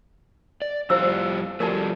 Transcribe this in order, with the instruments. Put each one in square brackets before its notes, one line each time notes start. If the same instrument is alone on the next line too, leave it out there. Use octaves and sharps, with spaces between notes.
[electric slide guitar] D5
[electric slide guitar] F2 G3 F4 [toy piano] E4 C5 E6
[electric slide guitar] F3 G3 A3 [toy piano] A#4 D5 A5